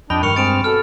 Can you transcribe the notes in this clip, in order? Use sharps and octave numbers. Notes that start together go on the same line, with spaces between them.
F2 D4 D#5 G5 B5
G2 D#3 C#6 F6 C#7 F7
G#3 C4 A6 D7 E7
B2 A4 F6